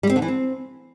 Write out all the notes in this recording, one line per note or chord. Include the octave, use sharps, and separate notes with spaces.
G3
C4
D3
E3
C4